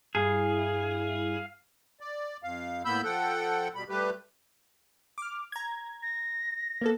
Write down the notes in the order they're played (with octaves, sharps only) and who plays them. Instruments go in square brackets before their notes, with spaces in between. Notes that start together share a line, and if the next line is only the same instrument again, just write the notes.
[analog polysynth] G2 E4 [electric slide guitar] G#4 [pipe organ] F5
[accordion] D5
F2 F5
A2 A#3 B3 B5 E6 G6
F3 A4 F#5 G5
B2 G3 B5
G3 A3 G4 B4
[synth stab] D6 F6
A#5 G#6
[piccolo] A#6
[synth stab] A#3 B3 A4